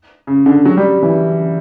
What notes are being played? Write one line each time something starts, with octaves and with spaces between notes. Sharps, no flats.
C#3
D3
F#3
G3
E3